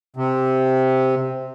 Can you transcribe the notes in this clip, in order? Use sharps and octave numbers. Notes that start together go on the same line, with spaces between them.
C3